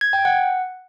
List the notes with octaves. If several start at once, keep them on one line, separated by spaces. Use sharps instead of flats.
G#6
G5
F#5